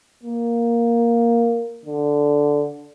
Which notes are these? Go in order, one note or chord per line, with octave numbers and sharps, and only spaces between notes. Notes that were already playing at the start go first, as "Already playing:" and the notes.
A#3
D3